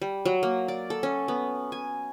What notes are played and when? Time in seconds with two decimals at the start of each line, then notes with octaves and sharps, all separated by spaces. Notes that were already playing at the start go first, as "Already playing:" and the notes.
0.02 G3
0.25 F#3
0.43 A#3
0.68 D5
0.90 A4
1.03 C#4
1.28 B3
1.72 G#5